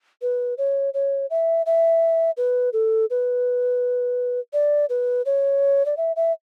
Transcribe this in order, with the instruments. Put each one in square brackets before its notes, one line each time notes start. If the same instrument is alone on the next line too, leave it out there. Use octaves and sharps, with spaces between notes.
[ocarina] B4
C#5
C#5
E5
E5
B4
A4
B4
D5
B4
C#5
D5
E5
E5